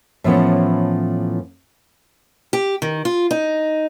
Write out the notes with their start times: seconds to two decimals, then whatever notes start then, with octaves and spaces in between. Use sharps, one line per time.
0.24 A2 E3 F3 A3 B3 C#4
2.53 G4
2.82 D#3
3.05 F4
3.31 D#4